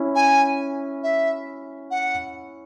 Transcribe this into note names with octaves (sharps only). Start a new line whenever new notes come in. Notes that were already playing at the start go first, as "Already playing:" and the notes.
Already playing: C#4 E4
G#5
E5
F#5